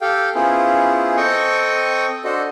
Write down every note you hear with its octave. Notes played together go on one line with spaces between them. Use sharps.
G4 A4 F5 G5
B3 C#4 E4 F4 G#4 C5
C4 A4 D#5 G5 C#6 D#6
D4 F#4 A4 C5 D#5